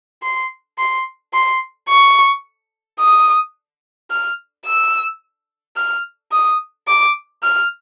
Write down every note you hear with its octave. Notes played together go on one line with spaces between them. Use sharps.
C6
C6
C6
C#6
D#6
F6
E6
F6
D#6
D6
F6